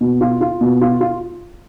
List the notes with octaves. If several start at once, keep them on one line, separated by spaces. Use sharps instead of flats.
B2
F4
F4
B2
F4
F4